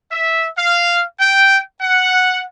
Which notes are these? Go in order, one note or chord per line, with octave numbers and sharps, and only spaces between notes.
E5
F5
G5
F#5